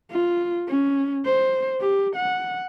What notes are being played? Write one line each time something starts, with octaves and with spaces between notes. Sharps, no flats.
F4
C#4
C5
G4
F#5